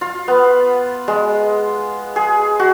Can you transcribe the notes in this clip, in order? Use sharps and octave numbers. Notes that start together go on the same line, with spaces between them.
F4
B3
G#3
G#4
F#4